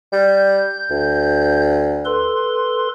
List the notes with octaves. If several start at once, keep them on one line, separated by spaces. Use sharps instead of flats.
G3 G6
D2
A4 B4 C6